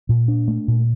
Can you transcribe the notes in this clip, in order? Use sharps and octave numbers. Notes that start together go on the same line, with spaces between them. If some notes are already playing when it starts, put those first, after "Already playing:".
A#2
D4
A3
A#2